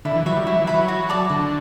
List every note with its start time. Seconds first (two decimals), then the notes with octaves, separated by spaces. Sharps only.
0.05 D3 E4
0.16 E3
0.26 F#3 B4 E5 B5
0.36 G3
0.47 F#3 E4
0.60 E3
0.67 B4 E5 B5
0.74 F#3
0.88 F#4
1.09 A4 D5 A5
1.29 D3 F#4